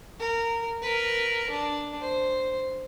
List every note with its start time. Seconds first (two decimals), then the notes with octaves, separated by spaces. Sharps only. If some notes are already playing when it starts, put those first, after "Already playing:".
0.20 A#4
0.82 A#4 B4
1.50 D4
2.01 C5